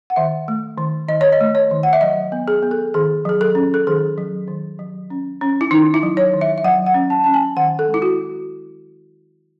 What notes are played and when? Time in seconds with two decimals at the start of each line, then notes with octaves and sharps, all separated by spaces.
0.10 F#5
0.16 D#3 E5
0.48 A3
0.78 D#3
1.09 D#3 D#5
1.21 C#5
1.32 D#5
1.41 A3
1.55 C#5
1.71 D#3
1.83 F#5
1.93 E5
2.01 F#3 D#5
2.32 B3
2.48 G#4
2.63 B3
2.71 A4
2.94 D#3 G#4
3.25 F#3 G#4
3.41 A4
3.55 C#4
3.74 A4
3.87 D#3 G#4
4.18 F#3
4.48 D#3
4.79 F#3
5.10 C#4
5.41 C#4
5.61 E4
5.71 D#3 D#4
5.94 E4
6.03 F#3
6.17 C#5
6.33 D#3
6.41 E5
6.58 E5
6.65 F#3 F#5
6.86 F#5
6.94 C#4
7.10 A5
7.24 C#4 A5
7.34 G#5
7.57 D#3 F#5
7.79 A4
7.88 G#3
7.94 E4
8.02 F#4